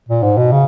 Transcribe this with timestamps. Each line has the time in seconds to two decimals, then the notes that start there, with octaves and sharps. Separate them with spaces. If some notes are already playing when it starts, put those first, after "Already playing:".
0.09 A#2
0.23 G#2
0.37 B2
0.52 C#3